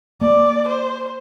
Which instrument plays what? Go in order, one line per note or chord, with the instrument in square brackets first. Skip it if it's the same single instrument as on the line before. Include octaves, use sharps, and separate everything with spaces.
[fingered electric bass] A#3 [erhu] D5
[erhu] C5